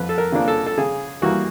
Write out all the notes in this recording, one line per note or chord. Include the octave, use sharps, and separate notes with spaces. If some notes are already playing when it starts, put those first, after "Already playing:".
Already playing: F2 B4
A4
A#4
C#3 F3 A#3 D4
A4
A4
C#3 G#4
E3 G3 A#3 F#4